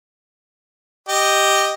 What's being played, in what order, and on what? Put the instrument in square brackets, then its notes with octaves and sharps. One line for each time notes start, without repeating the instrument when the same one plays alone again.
[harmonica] G4 D#5